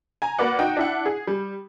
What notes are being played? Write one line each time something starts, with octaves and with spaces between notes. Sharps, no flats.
G#5 A#5
A#3 F#4 B4 D5 F#5
D#4 F#4 G5
D4 E4 F#5
G#4
G3